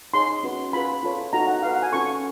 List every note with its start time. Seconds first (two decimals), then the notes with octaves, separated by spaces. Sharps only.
0.13 D#4 G#4 C#5 C6
0.43 C#4 F#4 B4
0.73 F4 G#4 B4 B5
1.03 F4 A4 C#5
1.33 D#4 F#4 A4 A#5
1.47 F#5
1.63 F#4 B4 F5
1.73 F#5
1.82 G#5
1.92 C#4 F4 A4 C#6